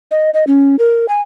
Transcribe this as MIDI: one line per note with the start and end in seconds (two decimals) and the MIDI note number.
0.11 0.30 75
0.34 0.44 75
0.47 0.76 61
0.79 1.06 70
1.09 1.21 80